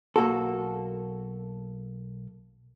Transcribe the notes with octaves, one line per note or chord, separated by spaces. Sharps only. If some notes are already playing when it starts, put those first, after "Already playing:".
B1 A#3 F#4 A4